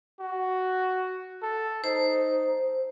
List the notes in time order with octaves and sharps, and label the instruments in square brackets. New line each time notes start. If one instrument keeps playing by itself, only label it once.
[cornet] F#4
A4
[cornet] D#4 [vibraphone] C5